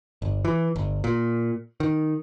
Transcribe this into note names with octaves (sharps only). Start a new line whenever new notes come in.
G1
E3
G1
A#2
D#3